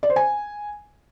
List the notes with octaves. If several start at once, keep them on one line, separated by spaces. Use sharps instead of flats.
D5
C5
G#5